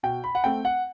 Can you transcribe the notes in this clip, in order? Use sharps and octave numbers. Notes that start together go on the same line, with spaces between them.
B2 G5
B5
F#5
A3 C4 G5
F#5